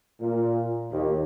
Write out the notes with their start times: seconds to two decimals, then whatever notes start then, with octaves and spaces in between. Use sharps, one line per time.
0.20 A#2
0.91 D#2